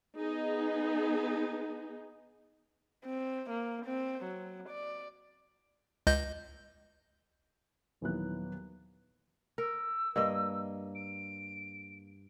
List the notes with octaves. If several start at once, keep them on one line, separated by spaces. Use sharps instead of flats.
B3 D#4 G#4
C4
A#3
C4
F#3
D5
C#2 D#5 G6
D#1 D#2 E3 F#3 B3 F#6
A#4 E6
G2 A#3 D#5
D7